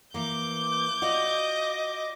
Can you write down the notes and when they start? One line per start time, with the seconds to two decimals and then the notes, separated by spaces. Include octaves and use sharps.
0.14 E3 A#3 D6 G6
1.02 F4 F#4 D5 D#5